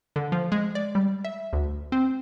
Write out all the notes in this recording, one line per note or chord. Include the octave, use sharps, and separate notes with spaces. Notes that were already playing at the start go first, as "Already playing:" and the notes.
D3
F3
G#3
D5
G3
E5
D2
C4